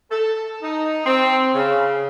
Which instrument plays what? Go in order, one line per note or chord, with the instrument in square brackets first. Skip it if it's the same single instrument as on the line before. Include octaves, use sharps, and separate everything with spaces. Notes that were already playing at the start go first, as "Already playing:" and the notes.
[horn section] A4
D#4
C4
C#3